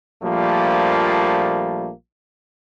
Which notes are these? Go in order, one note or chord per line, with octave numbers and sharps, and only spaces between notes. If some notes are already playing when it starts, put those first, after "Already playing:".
A#1 F3 G3 A3 A#3